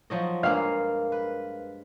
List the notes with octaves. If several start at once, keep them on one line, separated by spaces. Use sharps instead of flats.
F3 F#3 D#5
G2 G#3 A#3 F5
B4